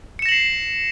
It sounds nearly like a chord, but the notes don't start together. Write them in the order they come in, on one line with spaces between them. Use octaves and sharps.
C#7 E7 A#6 F#7 C7